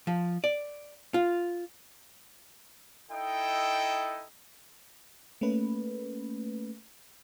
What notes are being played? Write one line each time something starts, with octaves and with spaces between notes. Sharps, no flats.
F3
D5
F4
D#4 E4 A4 D#5 G5
A3 A#3 C#4 B4